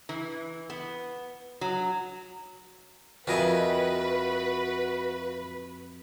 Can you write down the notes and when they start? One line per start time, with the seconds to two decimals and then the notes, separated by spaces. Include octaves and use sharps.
0.09 E3
0.70 B3
1.61 F#3
3.27 F2 F4 F#4 A#4 B4 D#5 E5 G#5